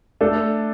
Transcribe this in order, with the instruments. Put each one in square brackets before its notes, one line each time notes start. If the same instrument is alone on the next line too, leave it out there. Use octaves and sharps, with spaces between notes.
[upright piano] A3 D4 A4